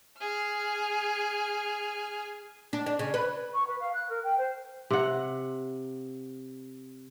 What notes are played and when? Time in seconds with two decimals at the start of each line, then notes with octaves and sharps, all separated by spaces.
0.19 G#4 F6
2.73 D4
2.86 D4
2.99 C#3
3.14 B4
3.53 C#6
3.66 B4
3.79 F5
3.93 F#6
4.08 A#4
4.23 G5
4.37 C5
4.90 C3 F#5